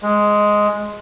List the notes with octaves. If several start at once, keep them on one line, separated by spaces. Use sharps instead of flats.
G#3